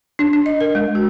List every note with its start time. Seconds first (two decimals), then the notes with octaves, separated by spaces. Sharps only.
0.19 D4
0.33 D4
0.46 D#5
0.61 A#4
0.75 G#3
0.95 F#4